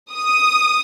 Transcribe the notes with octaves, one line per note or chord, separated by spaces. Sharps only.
D#6